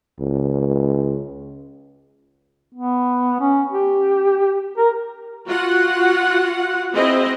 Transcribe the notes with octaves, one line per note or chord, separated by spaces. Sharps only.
C#2
B3
C#4
G4
A#4
F4 F#4 F#5
C4 E4 G#4 D#5